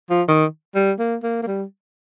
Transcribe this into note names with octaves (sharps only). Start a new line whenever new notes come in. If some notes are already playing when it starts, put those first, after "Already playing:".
F3
D#3
G3
A#3
A#3
A#3
G3